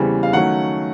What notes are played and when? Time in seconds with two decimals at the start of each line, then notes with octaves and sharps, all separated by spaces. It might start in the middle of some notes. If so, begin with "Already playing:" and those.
Already playing: E2 C#3 E3 G3 C4
0.23 F5
0.33 D#3 F#3 A3 C#4 F#5